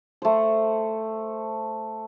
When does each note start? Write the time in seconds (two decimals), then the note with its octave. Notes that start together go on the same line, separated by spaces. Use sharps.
0.22 A3 C5